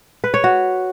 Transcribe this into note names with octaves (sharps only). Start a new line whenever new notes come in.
B4
C#5
F#4